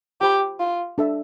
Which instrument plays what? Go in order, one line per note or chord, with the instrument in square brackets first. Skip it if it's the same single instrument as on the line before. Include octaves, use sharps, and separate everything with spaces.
[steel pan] F4 C5 G5 B5 [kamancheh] G4
[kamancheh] F4
[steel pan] D4 A4 E5